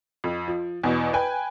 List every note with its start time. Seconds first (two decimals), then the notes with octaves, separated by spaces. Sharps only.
0.24 F2
0.48 F3
0.83 E2 B2
1.13 B4 G5 G#5